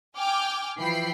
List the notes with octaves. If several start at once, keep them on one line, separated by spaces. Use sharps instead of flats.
G5 G#5 D6 F6
E3 F3 G5 B5 C7